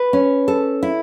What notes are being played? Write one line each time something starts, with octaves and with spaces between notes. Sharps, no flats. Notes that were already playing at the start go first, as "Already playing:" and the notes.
Already playing: B4
C#4
A4
E4